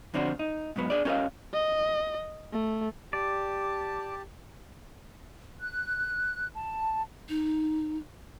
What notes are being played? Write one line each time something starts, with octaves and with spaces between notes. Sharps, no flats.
F2 D3 C4 D4 F#4
D#4
G#2 B2 F#3 B3
D4 G#4 D5
C#4 G4 A#4 B4 D#5 F5
D#5
A3
G4 D5 A5
F#6
A5
D#4